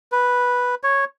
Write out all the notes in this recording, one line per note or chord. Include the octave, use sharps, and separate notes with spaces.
B4
C#5